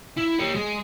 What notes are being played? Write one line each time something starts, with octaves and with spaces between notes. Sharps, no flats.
E4
G4 C#5
G#3